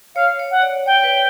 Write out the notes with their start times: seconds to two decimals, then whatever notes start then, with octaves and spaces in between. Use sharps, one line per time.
0.15 C#5 F5
0.39 C#5
0.51 F#5
0.62 D5
0.86 C#5 G5
1.04 B4